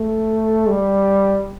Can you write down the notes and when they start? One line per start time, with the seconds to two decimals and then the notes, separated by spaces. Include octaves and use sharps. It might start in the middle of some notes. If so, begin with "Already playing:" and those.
Already playing: A3
0.69 G3